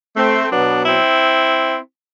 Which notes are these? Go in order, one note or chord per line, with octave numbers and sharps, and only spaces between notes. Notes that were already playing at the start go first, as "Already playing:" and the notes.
A3 C4
B2 F#3 B3 D4
C4 E4